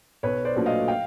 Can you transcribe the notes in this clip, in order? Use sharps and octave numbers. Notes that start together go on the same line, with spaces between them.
B1 B4 C#5
C5 D5
A#2 F#3 A3 D4
D#5 F5
F5 G5